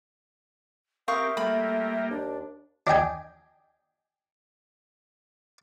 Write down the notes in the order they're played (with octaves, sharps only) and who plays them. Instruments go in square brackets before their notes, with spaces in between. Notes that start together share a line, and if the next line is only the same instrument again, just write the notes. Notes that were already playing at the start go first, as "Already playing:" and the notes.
[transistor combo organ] C4 G4 [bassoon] A#4 [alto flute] E5 [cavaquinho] F5 C#6 D#6
[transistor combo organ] G3 A#3 [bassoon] A3 [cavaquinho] B5
[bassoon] D#2 [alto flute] D4
[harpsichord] D4 D#5 G5 G#5